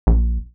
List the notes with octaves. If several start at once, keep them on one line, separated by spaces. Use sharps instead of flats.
A#1